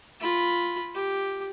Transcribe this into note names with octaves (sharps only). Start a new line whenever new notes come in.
F4 B5
G4